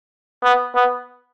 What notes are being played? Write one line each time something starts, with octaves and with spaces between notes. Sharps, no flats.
B3
B3